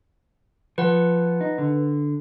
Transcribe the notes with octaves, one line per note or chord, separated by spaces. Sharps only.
F3 B4 F#5
D#4
D3